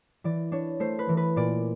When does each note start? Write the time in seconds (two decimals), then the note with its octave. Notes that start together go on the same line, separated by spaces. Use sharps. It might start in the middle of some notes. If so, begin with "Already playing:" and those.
0.24 E3 D5
0.52 D4 C#5
0.80 A3 C5
0.99 B4
1.09 E3
1.17 B4
1.36 A#2 D5